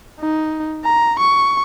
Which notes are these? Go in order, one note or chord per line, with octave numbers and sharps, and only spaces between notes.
D#4
A#5
C#6